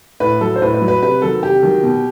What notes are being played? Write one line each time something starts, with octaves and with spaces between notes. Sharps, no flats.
A2 B4
F#3 A4
C5
A2 B4
B4
F#3
B4
C3 B4
D#3 F#3 A4
C3 G4
D#3 F#3
B2